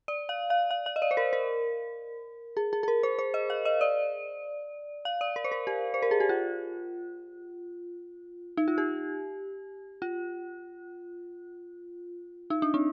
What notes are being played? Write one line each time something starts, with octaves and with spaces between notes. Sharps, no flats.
D5
F5
F5
F5
F5
D#5
D5
C5
A#4
A#4
G#4
G#4
G#4
A#4
C5
C5
D#5
F5
D#5
D5
F5
D5
A#4
C5
A#4
G4
C5
A#4
G#4
G4
F4
D#4
F4
G4
F4
D#4
D4
C4